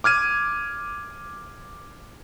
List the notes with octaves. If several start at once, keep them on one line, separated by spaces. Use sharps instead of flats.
D6 F6 G#6 D#7